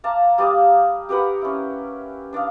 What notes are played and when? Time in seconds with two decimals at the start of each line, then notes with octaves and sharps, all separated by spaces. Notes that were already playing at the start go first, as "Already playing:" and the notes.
0.04 D5 F5 A5 A#5
0.38 G3 D5 D#5 F5
1.09 G4 A#4 B4 F#5
1.42 C#4 E4
2.33 D4 D5 D#5 F5